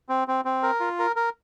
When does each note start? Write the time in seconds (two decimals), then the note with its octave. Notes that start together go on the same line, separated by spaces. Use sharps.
0.09 C4
0.28 C4
0.45 C4
0.63 A#4
0.80 F4
0.99 A#4
1.16 A#4